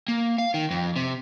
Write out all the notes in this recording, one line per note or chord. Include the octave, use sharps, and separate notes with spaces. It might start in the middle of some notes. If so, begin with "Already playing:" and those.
A#3
F5
D#3
F2
C3